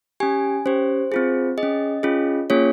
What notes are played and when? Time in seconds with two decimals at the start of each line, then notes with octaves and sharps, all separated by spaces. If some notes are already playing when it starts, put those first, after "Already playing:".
0.20 C#4 G4 G#5
0.66 C#4 G4 C5
1.12 C4 F4 G#4
1.58 G#4 D#5
1.63 C#4
2.03 C#4 F4 G#4
2.50 A#3 C#4 F4 G#4 C#5